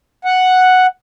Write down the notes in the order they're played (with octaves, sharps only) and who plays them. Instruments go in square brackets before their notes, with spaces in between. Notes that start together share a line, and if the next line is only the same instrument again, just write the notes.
[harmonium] F#5